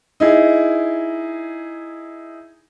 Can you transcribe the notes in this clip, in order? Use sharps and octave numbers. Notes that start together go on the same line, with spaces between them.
D#4 E4 G#4